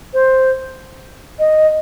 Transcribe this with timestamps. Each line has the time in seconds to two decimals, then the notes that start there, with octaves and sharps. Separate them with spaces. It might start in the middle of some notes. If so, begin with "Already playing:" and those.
0.14 C5
1.39 D#5